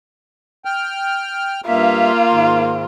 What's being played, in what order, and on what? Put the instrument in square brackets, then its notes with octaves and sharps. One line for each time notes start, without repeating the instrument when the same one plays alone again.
[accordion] G5 F6
[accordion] G2 E5 [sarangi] A#3 [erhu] F4
[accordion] G#2 D#3